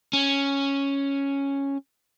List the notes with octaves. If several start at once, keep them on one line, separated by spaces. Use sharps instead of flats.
C#4